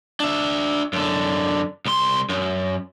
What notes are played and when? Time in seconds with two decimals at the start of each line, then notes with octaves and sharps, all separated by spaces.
0.20 D4 E5
0.93 F#2 D3
1.85 C2 C6
2.29 F#2